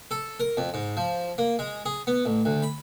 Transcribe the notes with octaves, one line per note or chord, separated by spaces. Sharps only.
A4
A#4
F2
G#2
F3
A#3
G#3
G#4
B3
A1
D2
B5